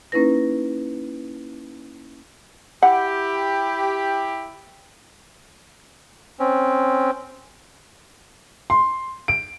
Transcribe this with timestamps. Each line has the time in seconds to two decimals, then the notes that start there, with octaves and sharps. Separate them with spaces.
0.12 A#3 C#4 D#4 E4 B4 A#6
2.83 E4 G4 F#5
6.39 C4 C#4
8.70 C6
9.28 D7